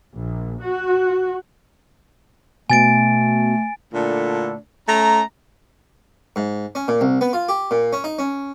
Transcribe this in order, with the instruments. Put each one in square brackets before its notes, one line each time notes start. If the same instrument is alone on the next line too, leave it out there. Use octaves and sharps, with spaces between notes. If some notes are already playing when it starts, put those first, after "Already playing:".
[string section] A#1
F#4
[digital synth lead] B2 [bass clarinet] A3 [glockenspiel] G#5 A6 D7
[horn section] A#2 D3 A3 D4 E4
A3 C#4 A#5
[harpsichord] G#2
C#4
A#2
C2
B3
F4
G4
A#2
C#4
D#4
C#4